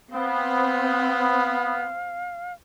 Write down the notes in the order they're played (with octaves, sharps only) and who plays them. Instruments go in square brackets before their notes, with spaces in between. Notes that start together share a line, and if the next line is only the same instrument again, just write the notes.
[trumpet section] B3 [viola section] C4 [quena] F5